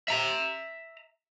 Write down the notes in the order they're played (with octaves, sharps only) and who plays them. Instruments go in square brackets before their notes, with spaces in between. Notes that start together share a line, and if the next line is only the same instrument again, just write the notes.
[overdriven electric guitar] E5 A#5